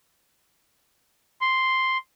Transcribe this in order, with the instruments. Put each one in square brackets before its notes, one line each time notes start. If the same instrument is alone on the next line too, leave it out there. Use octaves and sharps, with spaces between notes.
[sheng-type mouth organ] C6